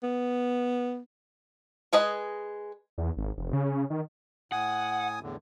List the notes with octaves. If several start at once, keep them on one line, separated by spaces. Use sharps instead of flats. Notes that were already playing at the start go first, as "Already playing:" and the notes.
B3
G#3 G#4 B4 D#5
E2
G#1
F1
C#3
D#3
A2 F#5 G#5 D#6
E2 A2 D3